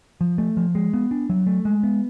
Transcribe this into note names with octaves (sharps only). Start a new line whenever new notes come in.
F3
A3
F3
G#3
B3
D4
F#3
A3
G#3
B3